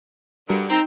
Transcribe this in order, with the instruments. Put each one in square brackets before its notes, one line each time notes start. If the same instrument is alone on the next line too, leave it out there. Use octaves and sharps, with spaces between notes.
[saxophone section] G2 D3 [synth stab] G3 F#4 A#4
[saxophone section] C4 [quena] D#4 [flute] A#5